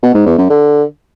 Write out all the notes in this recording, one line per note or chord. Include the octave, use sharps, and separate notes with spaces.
B2
G#2
E2
F#2
D3